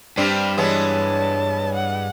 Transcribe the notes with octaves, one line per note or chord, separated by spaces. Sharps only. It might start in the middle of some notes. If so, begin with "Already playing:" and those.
G2 G3 C4 D4 F6
E3 G#3 B3 C#5 A5
F#5